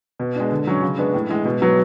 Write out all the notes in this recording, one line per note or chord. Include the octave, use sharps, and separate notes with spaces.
B2
G#3 D4
D3
F#3 C#4
C#3
G#3 B3 D4
A2
E3 G#3
B2
F#3 B3